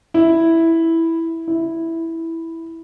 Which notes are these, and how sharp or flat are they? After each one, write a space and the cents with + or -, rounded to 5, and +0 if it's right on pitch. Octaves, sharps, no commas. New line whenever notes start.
E4 -5
E4 -5